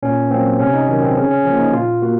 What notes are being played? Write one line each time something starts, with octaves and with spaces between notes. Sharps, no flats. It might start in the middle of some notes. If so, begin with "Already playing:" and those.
A#2 C#4
F#3 A#3 C4
C3 C#4
D#4
D#3 F#3 C#4
C4
C#3 C#4
C#4
F3 A#3 C#4
D#4
A#2 F4
A#3 F#4